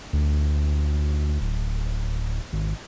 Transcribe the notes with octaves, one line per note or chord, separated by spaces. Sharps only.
D2
D1
G#1